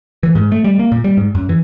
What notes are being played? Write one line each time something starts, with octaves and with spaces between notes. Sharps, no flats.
E3
G#2
A3
G3
A#3
A#2
G3
G#2
F#2
E3